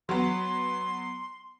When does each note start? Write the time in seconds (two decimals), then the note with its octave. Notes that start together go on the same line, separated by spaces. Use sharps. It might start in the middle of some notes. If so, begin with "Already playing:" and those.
0.09 F#3 B3 C6